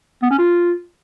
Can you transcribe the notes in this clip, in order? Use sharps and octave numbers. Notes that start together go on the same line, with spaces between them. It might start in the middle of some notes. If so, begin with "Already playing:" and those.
B3
C#4
F4